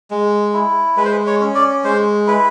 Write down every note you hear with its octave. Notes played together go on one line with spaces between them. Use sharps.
G#3
E4
G#3 B4
C5
B4
C#5
C#4
D5
G#3 C5
E4 B4